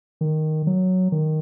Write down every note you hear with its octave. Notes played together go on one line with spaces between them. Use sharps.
D#3
F#3
D#3